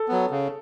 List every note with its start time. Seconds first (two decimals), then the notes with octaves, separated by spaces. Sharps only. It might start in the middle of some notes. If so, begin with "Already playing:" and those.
Already playing: A4
0.08 F#3 B3
0.31 C#3